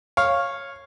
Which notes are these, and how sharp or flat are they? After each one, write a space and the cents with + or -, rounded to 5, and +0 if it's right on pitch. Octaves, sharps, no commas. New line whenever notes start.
C#5 -10 F5 +0